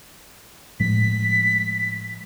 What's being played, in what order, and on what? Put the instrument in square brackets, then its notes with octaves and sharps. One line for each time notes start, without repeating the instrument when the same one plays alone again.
[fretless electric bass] A2 F3 G#3 [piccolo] B6